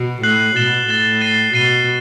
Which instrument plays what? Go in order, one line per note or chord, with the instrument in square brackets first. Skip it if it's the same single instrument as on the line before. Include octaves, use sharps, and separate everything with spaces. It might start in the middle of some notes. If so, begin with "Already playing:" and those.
Already playing: [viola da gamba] B2
[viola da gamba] A2 [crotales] F#6 C7 F#7
[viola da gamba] B2 [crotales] A6 E7 G7
[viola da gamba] A2 [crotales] A6 E7 G7
[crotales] A6 C7 D#7 G7
[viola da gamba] B2 [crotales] A6 C7 D#7 G7